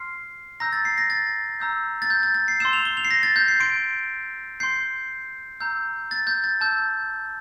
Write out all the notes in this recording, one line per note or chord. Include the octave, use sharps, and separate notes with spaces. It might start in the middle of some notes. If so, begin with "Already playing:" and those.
Already playing: C6 F6 C7
A#5 E6 G6 A#6
A6
C7
A#6
A6
A#5 E6 G6
A6
G6
A6
A6
C7
C6 E6 G6 E7
F7
G7
F7
C7
A#6
A6
G6
C7
C6 G6 D7
C6 G6 C7
A#5 E6 G6
A6
G6
A6
A5 E6 G6